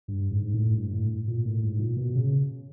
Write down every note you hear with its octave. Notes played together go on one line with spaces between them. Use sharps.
G2
G#2
G#2
A2
G2
A2
A#2
A2
G#2
A#2
B2
C#3